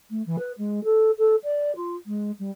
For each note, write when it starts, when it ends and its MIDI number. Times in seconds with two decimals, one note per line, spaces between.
0.10 0.24 57
0.26 0.36 52
0.38 0.52 71
0.58 0.83 56
0.84 1.11 69
1.18 1.35 69
1.43 1.75 74
1.75 1.95 65
2.06 2.31 56
2.39 2.50 55